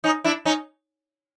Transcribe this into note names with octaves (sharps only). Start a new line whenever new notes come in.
C#4 D#4
D4 E4
C#4 D#4